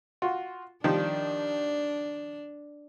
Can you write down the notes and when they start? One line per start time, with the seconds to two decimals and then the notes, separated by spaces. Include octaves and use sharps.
0.22 F4 F#4
0.84 D#3 F3 G3 D4